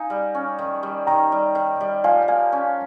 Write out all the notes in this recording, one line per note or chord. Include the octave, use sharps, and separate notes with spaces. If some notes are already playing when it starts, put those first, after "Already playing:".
Already playing: D#4 F5 G#5
G3
C#4
D#3
G3
D#3 G5 A#5
G3
D#3
G3
F3 F5 G#5
A#3 F5 G#5
C#4